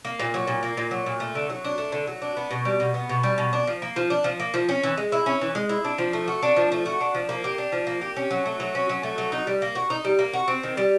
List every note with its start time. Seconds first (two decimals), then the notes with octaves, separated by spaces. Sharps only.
0.05 A#3
0.20 A#2
0.34 F#3
0.47 A#2
0.63 A#3
0.77 A#2
0.91 F#3
1.06 A#2
1.20 A3
1.35 D3
1.50 F#3
1.64 D4
1.78 A3
1.92 D3
2.07 F#3
2.22 D4
2.37 B3
2.51 B2
2.65 G3
2.80 B2
2.94 B3
3.09 B2
3.23 G3
3.38 B2
3.53 D4
3.67 F3
3.82 A#3
3.96 F3
4.10 D4
4.24 F3
4.40 A#3
4.54 F3
4.69 C#4
4.83 E3
4.97 G#3
5.12 E4
5.26 C#4
5.41 E3
5.55 G#3
5.69 E4
5.85 D4
5.98 F3
6.13 A3
6.28 F#4
6.43 D4
6.56 F3
6.72 A3
6.86 F#4
7.01 D4
7.15 F3
7.29 A#3
7.44 G4
7.58 D4
7.72 F3
7.87 A#3
8.01 G4
8.17 C#4
8.31 F#3
8.45 A3
8.60 F#3
8.75 C#4
8.89 F#3
9.03 A3
9.18 F#3
9.32 D#4
9.47 G3
9.62 A#3
9.75 F#4
9.90 D#4
10.05 G3
10.19 A#3
10.33 F#4
10.48 C4
10.63 D#3
10.77 G3